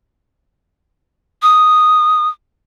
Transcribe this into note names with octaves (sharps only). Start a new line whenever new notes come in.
D#6